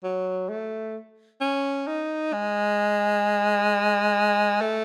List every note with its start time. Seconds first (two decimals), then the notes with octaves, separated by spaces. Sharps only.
0.03 F#3
0.50 A3
1.41 C#4
1.87 D#4
2.33 G#3
4.61 A3